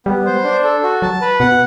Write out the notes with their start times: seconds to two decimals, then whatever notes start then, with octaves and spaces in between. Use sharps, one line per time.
0.06 G3 B3
0.26 C5
0.44 D4
0.64 A4
0.83 F#4
1.02 F#3 A5
1.21 B4
1.40 B2 F#5